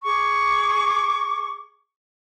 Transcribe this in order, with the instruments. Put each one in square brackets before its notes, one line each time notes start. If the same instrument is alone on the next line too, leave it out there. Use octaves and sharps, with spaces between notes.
[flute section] G#4 C#6 D6